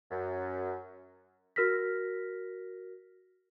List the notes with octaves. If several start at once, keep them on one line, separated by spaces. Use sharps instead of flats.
F#2
F#4 A#4 F6 A#6 B6